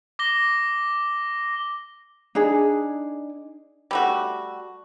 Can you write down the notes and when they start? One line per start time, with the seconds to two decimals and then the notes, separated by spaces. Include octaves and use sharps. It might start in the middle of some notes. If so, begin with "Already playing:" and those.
0.19 D6 A#6 G7
2.35 D4 D#4 G#4
3.91 G3 A3 F#4